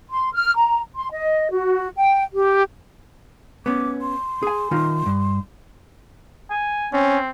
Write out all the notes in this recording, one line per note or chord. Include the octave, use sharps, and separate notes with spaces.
C6
F6
A#5
C6
D#5
F#4
G5
G4
B3 C#4 D6
C6
G#4 G#5
D#3 D#4 F4
G2
G#5
C4 C#4